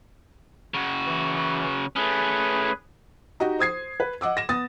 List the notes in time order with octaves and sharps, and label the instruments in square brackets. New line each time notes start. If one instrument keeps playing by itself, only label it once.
[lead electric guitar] C#3 F#4
[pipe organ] E3
[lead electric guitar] A3 C#4 [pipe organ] G#4 B4
[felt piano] D#4 F#4 G4 D#5
C5 D#6 G#6 C7
B4
D#5 F#5 D6 E6
A#6 E7
B3 D#6 A6